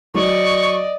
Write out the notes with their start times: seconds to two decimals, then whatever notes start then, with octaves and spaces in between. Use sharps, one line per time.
0.15 F#3 D5 D#5 C#6